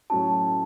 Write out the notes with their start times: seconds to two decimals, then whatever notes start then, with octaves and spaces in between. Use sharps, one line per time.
0.10 A2 F#3 A3 C#4 F#4 A5